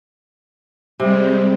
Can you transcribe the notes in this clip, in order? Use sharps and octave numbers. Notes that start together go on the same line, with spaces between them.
C3 G3 G#3 C4